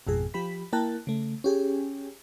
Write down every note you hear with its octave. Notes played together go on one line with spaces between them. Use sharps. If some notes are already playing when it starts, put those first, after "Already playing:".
G#1 F2 B2 G#4
F3 G4 B5 B6
A#3 E4 A#4 G5 A5 F#6
C#3 A3
C#4 G4 G#4